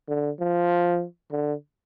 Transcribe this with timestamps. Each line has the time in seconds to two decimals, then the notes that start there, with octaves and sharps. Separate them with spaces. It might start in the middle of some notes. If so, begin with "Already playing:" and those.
0.08 D3
0.39 F3
1.32 D3